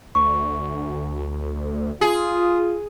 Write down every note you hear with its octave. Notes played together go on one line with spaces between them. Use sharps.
D2 C#6
F4 G#4